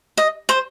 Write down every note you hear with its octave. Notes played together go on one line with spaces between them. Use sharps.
D#5
C5